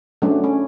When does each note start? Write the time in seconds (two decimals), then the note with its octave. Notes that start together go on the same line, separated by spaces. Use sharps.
0.22 F#3 A3 C#4 D4
0.44 C#4